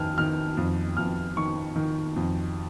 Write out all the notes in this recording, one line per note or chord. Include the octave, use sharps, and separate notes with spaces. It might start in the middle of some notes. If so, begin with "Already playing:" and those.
Already playing: F2 D#3 F6
D#3 F6
F2
F2 F6
D#3 C#6
D#3
F2